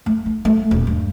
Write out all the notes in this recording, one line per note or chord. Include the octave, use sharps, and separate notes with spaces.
A3
D#4
A3
D#1
G2